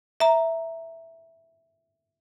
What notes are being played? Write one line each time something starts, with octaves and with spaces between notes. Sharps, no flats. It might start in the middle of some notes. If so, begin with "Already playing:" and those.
E5 A#5